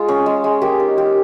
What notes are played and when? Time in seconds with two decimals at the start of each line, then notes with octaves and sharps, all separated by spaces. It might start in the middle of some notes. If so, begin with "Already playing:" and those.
Already playing: G#3 F4 G#4
0.08 C#4
0.26 G#3
0.44 G#3
0.62 A#3 G4
0.79 D#4
0.97 A#3 G4